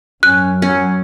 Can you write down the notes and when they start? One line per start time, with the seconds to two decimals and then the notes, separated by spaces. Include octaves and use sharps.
0.23 F#2 C#4 F#6
0.62 F#3 C#4